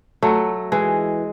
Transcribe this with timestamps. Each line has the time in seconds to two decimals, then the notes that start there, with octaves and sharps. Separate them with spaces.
0.23 F#3 A3
0.72 E3 G#3